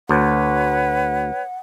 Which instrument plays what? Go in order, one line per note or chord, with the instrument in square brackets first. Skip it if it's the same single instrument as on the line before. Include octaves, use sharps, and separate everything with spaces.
[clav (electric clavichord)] D2 [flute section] B4 C#5 [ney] F#5